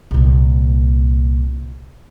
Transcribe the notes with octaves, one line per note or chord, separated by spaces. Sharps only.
C2 A#2